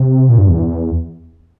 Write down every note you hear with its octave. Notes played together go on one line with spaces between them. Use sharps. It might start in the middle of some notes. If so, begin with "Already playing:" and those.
Already playing: C3
A#2
G2
E2